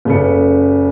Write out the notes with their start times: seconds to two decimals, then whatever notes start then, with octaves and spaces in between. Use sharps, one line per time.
0.05 F#1 C#3 A4 B4 C#7